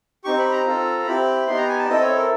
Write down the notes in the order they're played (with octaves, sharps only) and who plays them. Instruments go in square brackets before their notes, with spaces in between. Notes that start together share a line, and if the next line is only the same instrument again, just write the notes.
[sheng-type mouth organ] C4 D#4 G4 C#6
B5
A#5
C4 F4 A4
C4 E4 G4 B5
B3 D#4 G4 C6
A#5
G#5
A5
D5
C4 E4 A4 D#5
C#5
A#4